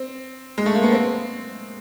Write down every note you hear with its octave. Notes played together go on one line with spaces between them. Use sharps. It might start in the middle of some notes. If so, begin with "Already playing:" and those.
Already playing: C4
G#3
A3
A#3
B3
C4